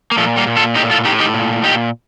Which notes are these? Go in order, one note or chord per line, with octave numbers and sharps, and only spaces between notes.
A#3
A#2 F3 A3
G3 A#3
A#2
F4 A4
A2 D#4 G4
F4 A4
A2 D#4 G4
D#4 G4
A#2
A#2 D#4 G4